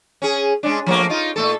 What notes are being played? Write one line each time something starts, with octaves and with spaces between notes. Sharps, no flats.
C#4 G#4
G#3 C#4 D4
F3 A3 A#3
D#4 F4
A#2 A3 A4